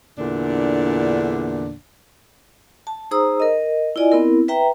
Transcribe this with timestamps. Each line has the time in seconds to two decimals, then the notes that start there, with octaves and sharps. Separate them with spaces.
0.18 E2 A#2 D3 D4
2.87 A5
3.11 D#4 G#4 C5 A#5 D#6 E6
3.40 A#4 D#5
3.96 E4 F4 D5 D#5 G#5
4.12 B3 C4 E4 A#4
4.48 B4 E5 G5 A#5